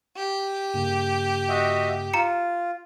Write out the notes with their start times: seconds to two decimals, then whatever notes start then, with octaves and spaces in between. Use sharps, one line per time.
0.16 G4
0.74 G2 C#3 A#3
1.49 F#4 D#5 E5
2.13 F4 A#5 C#7